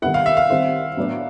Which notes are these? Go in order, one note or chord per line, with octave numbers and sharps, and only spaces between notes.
D#3 G3 B3 E4 F#5
F5
E5
F5
D#3 G3 C4 E4
A2 F#3 B3 D4